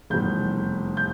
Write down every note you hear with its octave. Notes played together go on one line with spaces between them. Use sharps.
F1 E2 B2 G3 G6
G6